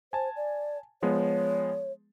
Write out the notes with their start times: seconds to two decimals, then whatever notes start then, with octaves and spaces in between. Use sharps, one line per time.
0.13 C5 G#5 A5
0.36 D5
1.02 F3 G#3 B3 C#5